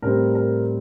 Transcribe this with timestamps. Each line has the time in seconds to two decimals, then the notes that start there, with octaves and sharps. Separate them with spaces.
0.02 A2 G3 C4 A#4
0.35 A#4